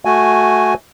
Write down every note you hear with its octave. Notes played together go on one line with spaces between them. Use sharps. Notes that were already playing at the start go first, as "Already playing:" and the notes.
A3 F#4 G#5